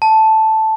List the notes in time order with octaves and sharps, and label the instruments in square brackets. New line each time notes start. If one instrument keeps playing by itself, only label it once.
[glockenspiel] A5